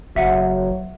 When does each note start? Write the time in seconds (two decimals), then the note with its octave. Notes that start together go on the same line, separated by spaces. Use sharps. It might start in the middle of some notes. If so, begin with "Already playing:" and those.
0.16 F#1 F#3 E5 F#5 D#7